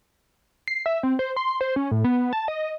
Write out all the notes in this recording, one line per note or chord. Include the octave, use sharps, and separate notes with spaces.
C7
E5
C4
C5
C6
C5
C#4
A2
B3
A5
D#5